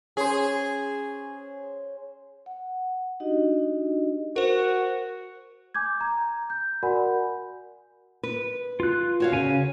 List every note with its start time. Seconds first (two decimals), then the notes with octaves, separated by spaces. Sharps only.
0.17 C#4 G#4 C5
2.46 F#5
3.20 D4 D#4 F#4 G4 D#5
4.36 F#4 A#4 C5
5.74 G#5 D6 G6 G#6
6.01 A#5
6.50 G6
6.83 F#4 A#4 D5 F#5 G#5 B5
8.23 B4
8.80 F4 F#6
9.20 F#4 C#5 F5
9.32 C#3 G#5